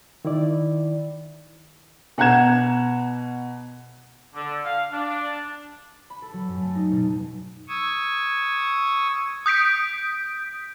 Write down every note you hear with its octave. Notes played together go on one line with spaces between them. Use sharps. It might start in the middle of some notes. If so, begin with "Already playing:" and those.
D#3 E4 D5
B2 F#5 A#5 G#6 E7
D3
F5
D4
B5
A4
F#3
F#2
A3
D#4
B2
C#6 D#6 E6 G#6
D#6 G6 B6 D7